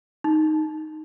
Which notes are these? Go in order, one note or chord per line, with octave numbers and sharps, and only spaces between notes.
D#4